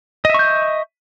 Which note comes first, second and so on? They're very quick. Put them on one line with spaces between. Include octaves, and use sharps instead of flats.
D#5 E5 C#6 G6